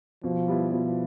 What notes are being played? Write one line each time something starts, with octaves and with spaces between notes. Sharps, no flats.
B2 F3
G3 B3 E4 B4
B2 F3